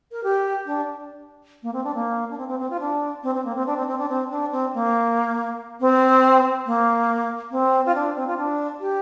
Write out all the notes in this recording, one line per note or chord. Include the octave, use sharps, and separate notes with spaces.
A#4
G4
D4
A#3
C4
D4
A#3
D4
C4
C4
C4
F4
D4
C4
C4
A#3
C4
D4
C4
C4
D4
C4
D4
C4
A#3
C4
A#3
C4
F4
D4
C4
F4
D4
G4